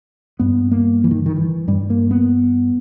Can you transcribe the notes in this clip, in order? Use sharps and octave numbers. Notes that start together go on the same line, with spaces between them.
G2 B3
A#3
E3
D#3
D#3
E3
G2 G3
A#3
B3